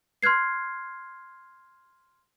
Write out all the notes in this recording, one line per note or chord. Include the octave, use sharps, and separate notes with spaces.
C6 F6 F#6 G#6 C7